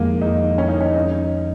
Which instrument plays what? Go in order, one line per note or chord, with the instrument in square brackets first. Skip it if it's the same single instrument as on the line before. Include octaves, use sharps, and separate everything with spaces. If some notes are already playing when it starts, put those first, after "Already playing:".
Already playing: [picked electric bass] F2 D#3 G#3 [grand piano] A#3
[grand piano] D#4
C#4
D#4
C#4
D#4